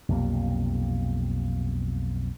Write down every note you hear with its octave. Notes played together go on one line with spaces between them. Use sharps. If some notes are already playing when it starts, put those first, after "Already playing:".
B1 F2 C3 A#3